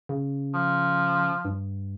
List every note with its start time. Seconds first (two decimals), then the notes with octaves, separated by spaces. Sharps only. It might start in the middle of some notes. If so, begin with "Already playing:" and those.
0.09 C#3
0.54 F3
1.45 G2